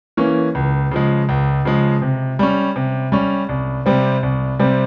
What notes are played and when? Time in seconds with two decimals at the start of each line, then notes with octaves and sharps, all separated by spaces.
0.17 E3 A#3 C#4
0.55 C#2
0.91 C#3 F3 G#3
1.29 C#2
1.65 C#3 F3 G#3
2.02 C3
2.39 G3 C#4
2.76 C3
3.12 G3 C#4
3.49 C2
3.86 C3 G3 C4
4.23 C2
4.60 C3 G3 C4